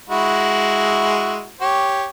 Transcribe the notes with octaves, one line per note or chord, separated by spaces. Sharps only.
G#3 E4 F#4
G4 C#5